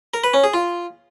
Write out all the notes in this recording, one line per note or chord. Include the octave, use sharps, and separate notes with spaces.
A#4
B4
C#4
G#4
F4